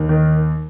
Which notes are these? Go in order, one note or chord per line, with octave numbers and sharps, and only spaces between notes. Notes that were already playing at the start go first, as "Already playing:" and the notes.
Already playing: D#2
D#3